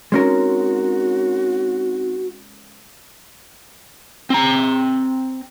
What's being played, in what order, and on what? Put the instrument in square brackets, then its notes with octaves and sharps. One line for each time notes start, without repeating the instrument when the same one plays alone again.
[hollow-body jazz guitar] G#3 C#4 A#4 [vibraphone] C4 D#4 [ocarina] F#4
[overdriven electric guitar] C4 A#5